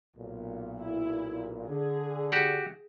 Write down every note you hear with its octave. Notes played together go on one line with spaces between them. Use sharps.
B1 A#2
E4
D3 G#4
F#4 G4 F#5